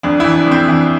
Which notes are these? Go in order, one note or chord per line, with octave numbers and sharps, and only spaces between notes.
F2 D4
E3 E4
D4
F2 C4
E3 D4